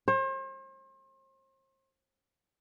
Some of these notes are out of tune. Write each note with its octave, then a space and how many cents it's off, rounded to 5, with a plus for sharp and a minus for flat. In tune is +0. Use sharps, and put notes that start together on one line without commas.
C5 +40